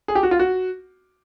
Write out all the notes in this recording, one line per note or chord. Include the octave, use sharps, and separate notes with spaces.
G#4
G4
F#4
F4
F#4